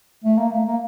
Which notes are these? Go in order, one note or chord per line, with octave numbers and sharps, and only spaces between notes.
A3
A#3
A3
A#3